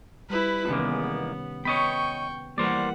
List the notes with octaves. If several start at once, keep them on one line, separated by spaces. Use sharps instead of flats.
G3 E4 B4
E2 C3 D#3 G#3 A#3 B3 C#4
B3 C#5 D#5 G5 B5 C#6
E3 G3 A#3 A#4 C5 D5 F#5